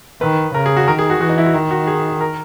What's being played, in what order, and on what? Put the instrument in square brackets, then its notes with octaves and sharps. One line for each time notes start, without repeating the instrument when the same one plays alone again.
[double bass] D#3 [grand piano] B4
[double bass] C#3 [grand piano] A#4
[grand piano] G#4
F#4
[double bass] D#3 [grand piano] A#4
[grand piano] G#4
F#4
[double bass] E3 [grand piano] F#4
[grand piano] D#4
E4
F#4
[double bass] D#3
[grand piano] F#4
G#4
A#4